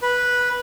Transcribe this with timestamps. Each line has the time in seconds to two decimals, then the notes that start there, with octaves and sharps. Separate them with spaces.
0.02 B4